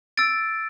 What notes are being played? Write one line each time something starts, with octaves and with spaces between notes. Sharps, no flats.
E6 A6 D7